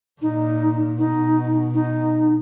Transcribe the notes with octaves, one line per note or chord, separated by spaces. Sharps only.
A#2 D#4
B2 D#4
D#4